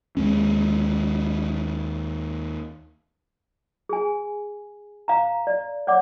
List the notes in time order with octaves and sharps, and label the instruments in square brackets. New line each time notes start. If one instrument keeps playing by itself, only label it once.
[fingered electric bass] D#2 G#3 C#4
[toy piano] G#4 G#5
F5 A#5
D5
C#5 D5 F#5 D6